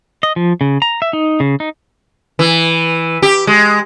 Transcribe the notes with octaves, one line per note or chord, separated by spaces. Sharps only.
D#5
F3
C#3
A#5
E5
D#4
C#3
D#4
E3
G4
G#3